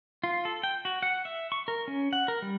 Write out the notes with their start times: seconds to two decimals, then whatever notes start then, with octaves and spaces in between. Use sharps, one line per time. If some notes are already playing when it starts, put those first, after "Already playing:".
0.24 F4
0.45 A4
0.63 G5
0.85 F#4
1.03 F#5
1.25 E5
1.52 C#6
1.68 A#4
1.88 C#4
2.13 F#5
2.28 A#4
2.42 G3